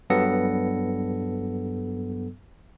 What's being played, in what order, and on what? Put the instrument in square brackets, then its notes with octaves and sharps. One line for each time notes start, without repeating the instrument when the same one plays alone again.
[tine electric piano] G2 F#3 B3 A4 A#6 C#7